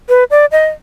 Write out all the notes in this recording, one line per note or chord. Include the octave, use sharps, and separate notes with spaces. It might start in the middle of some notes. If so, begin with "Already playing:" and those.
B4
D5
D#5